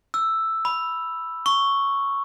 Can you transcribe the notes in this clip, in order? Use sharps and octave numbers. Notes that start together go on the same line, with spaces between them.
E6
B5
C#6